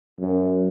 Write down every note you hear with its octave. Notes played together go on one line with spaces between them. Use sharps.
F#2